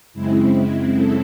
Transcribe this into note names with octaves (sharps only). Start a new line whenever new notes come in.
F#2 C#3 G#3 C4 E4
A4